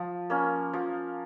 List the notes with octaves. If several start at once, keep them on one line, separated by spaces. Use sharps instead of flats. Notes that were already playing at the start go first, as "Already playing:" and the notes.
Already playing: F3
A#3 C#4
F3